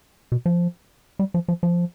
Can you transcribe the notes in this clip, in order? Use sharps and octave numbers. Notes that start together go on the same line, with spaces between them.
B2
F3
G3
F3
F3
F3